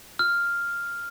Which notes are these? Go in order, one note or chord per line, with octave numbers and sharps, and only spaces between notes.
F6